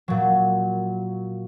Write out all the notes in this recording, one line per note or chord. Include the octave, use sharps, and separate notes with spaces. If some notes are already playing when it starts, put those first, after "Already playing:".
A#2 F#3